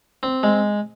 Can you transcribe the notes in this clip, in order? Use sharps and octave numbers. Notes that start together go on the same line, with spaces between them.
C4
G#3